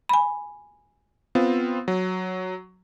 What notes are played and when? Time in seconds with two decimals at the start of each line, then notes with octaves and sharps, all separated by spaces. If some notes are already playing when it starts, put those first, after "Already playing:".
0.09 G#5 B5
1.35 B3 C4 F4
1.88 F#3